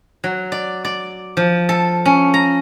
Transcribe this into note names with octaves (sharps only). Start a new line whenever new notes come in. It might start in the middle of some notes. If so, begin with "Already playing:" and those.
F#3
D5
D5
F3
A4
C#4
A#5